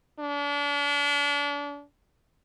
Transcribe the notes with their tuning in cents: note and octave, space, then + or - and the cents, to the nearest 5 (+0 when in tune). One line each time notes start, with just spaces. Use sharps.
D4 -35